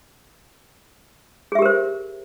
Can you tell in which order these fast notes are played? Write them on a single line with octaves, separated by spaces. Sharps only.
G#4 E5 G4 A#4 C5